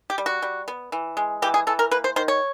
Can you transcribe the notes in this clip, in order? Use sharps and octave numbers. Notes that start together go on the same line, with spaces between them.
G4
G3
F#4
G3
B3
E3
G#3
E3 G4
G#4
E3 A4
A#4
A#3 B4
C5
D#3 C5
C#5